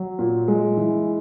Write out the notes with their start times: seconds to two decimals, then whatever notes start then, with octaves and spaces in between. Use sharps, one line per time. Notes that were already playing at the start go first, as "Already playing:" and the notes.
Already playing: F#3
0.19 A#2
0.48 G#3
0.77 E3